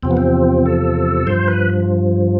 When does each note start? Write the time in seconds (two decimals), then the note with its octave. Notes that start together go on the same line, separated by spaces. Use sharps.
0.03 E2 C3 F3 C4
0.11 B3
0.17 C4
0.66 A4
1.27 G2 F3 C5
1.48 B4